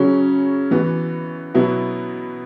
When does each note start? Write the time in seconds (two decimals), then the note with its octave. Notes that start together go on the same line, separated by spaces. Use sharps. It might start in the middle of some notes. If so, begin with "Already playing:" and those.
Already playing: C#3 F#3 C#4
0.71 E3 B3 F#4
1.54 B2 F#3 B3 E4